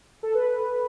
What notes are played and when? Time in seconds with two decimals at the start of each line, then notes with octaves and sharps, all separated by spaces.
0.23 A4
0.34 B4